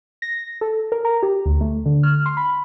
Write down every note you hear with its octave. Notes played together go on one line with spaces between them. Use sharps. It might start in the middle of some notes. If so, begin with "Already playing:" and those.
A#6
A4
A#4
A#5
G4
D2
A3
D3
F6
C6
B5